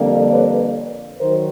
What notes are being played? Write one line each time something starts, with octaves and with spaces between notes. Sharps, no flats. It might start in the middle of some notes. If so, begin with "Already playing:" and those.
Already playing: F2 D3 G3 A#3
B4 C#5
D#3 F#3 A#4 C5